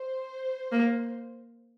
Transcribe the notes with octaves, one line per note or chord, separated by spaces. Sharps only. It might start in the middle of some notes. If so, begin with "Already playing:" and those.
Already playing: C5
A#3